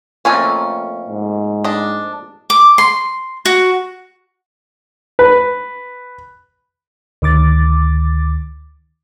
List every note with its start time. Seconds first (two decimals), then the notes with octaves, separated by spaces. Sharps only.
0.25 F2 A3 A#3 C#4 F4 G#5
1.09 G#2
1.64 D4 D#5
2.50 D6
2.78 C6
3.45 F#4
5.19 B4
7.22 D2 D#3 D6 A6